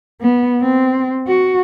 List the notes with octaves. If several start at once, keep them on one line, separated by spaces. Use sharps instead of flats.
B3
C4
F#4